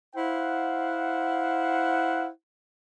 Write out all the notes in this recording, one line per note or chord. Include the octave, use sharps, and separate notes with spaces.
E4 C5 F5 F#5